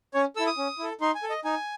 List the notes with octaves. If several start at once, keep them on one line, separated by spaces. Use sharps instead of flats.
C#4 C#5
E4 A4 E6
D#6
C#4
E4 A4
D#4 C6
G#5
A4
D#5
D#4 G#5